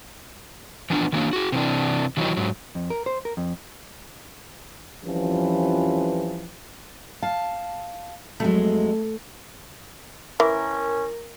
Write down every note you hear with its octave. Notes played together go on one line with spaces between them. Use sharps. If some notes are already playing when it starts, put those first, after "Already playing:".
E3 F3 B3 D4
D#3 E3 F#3 A#3 D4
F#4 G#4
C3 E3 D4
D#3 E3 F#3 D#4
G#2 F#3
F2
A#4
C5
A#4
F2
F2 E3 F3 G3 C#4 B4
F5 A5
F2 F#3 G#3 A3
E3 C#4 A#4